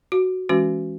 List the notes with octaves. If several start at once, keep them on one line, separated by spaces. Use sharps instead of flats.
F#4
E3 G#3 C#4 F#4